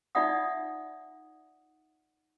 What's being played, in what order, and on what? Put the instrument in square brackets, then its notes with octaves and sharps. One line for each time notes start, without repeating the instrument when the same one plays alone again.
[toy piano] D#4 F4 D5 E5 F#5 D#6